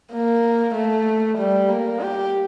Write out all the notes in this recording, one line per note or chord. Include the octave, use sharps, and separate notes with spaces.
A#3
A3
G3
A#3
G4